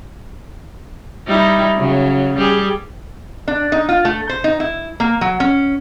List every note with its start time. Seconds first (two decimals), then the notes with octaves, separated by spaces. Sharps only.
1.27 G3 D#4 E4
1.77 C#3 F#3
2.36 G3 G4 G#4
3.48 D4
3.72 D#4
3.89 F4
4.05 A3
4.29 C5
4.44 D#4
4.60 E4
5.00 A#3
5.21 F#3
5.40 C#4